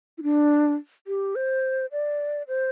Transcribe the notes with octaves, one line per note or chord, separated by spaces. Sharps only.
E4
D4
G4
C5
D5
C5